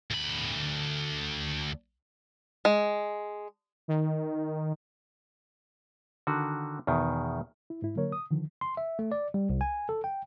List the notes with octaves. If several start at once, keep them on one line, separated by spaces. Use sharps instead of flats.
D2 B5
G#3
D#3
D3 D#3 F#4
E2 B2 D#3
E4
G#2 E4
D3 F#3 A#3 A#4 C#5
D#6
D3 D#3 F3
C6
E5
A3
D5
G3
C2
G#5
A4
G5